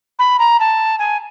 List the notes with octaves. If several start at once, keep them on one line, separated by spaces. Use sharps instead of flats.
B5
A#5
A5
G#5